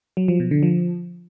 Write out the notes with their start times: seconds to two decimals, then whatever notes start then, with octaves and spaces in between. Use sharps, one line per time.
0.17 F#3
0.28 F3
0.40 B2
0.51 D3
0.63 F3